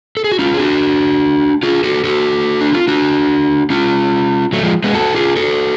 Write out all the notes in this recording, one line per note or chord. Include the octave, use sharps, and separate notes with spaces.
A4
G#4
F#4
C#4 F4
G#4
D4 F#4
F4 G#4
F#4 A4
F#4 A4
D4
F4
D4 F#4
C#4 F4
F#3 A3
F3 G#3
G#3 B3
F#4 A4
F4 G#4
F#4 A4